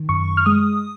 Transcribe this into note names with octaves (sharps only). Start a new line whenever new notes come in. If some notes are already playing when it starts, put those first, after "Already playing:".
Already playing: D#3
F#2 C#6
F6
G#3 D#6